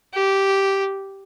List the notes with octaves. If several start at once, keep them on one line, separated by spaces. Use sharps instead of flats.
G4